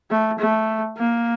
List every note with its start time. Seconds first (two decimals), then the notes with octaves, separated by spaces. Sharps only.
0.11 A3
0.39 A3
0.98 A#3